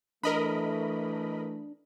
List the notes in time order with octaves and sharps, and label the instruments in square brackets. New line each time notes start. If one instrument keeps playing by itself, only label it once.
[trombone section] E3 A3 [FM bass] D4 [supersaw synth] A#4 D#5 B5